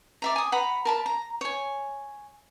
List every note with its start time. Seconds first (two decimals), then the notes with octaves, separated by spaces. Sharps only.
0.22 D5 E5 A#5
0.36 G#5 D#6
0.52 B4 F#5 A#5 B5
0.85 A#4 A5 B5
1.06 A#5
1.41 C#5 G#5